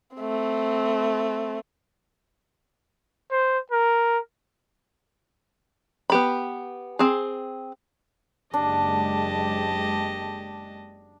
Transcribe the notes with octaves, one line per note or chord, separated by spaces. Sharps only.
A3 C4
C5
A#4
B3 G4 B5
C4 G#4
F#1 G#3 D4 G4 D#5 A5